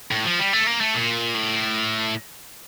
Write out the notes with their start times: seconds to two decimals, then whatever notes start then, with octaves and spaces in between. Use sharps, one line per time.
0.11 A2
0.25 F3
0.39 G3
0.53 A3
0.67 A#3
0.81 A3
0.94 A#2
1.34 A2